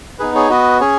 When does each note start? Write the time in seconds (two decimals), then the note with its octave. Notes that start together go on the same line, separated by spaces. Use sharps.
0.19 B3 D#4 G#4 B4
0.35 G#4 C#5
0.50 B3 F#4 B4 D#5
0.80 C#4 G#4 C#5